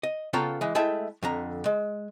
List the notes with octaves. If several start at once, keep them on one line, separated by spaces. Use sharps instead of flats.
D#5
C#3 B3 F4 A4 G5 A#5
E3 G#3
G#3 A3 E4 G5 A5
F2 D3 A#5
G#3